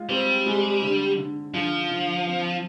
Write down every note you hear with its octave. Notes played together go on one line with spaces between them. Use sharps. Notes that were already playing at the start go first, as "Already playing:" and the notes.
Already playing: G#3 F4
G3 C4
G#3
D3
D3
D3 F3
D3
C4